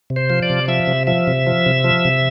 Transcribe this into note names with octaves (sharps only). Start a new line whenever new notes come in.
C3
C5
F3
D5
C3
F3 E5
C3
F3 E5
C3
F3
C3
F3
C3